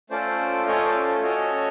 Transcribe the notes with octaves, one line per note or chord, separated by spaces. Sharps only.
A3 C#4 F4 A4 C5 D5
A3 C#4 F4 A4 C#5 D#5
C5 D5
C#4 F#4 A4 C#5 D#5